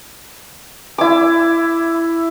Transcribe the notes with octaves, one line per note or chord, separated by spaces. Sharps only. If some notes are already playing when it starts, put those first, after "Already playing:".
E4 D6